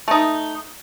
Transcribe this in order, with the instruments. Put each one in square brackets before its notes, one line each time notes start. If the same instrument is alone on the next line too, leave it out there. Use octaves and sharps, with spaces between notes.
[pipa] A3 D#4